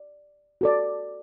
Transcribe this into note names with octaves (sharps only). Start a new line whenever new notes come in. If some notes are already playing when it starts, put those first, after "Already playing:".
Already playing: D5
F#4 A4 D5